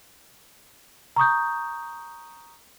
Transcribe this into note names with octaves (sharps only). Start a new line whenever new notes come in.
A#5 C#6 D#6 G6